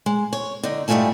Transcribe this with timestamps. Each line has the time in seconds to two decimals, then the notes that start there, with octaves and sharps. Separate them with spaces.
0.06 G#3
0.33 C#5
0.63 D3 D#4
0.88 G#2 G3 A3 F4 G#5 A5